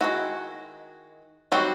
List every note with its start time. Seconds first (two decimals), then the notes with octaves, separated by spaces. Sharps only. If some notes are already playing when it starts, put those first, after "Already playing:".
0.01 D#3 F#3 G#3 C#4 E4 F#4
1.52 D#3 F#3 G3 C4 F#4